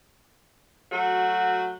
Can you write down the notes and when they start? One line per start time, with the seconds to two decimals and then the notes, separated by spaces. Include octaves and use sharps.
0.91 F#3 A3 F#4